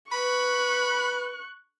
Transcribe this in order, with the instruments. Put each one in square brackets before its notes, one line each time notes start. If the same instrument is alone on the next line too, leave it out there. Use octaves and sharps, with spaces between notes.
[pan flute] B4 [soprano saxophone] B5 [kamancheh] C#6 F#6